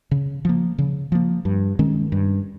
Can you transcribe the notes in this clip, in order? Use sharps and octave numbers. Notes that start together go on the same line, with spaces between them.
C#3
F3 A#3
C#3
F3 A#3
G2
D#3 G#3 C#4
G2